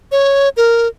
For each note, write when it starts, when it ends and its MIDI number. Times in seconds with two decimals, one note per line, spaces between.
0.12 0.49 73
0.57 0.87 70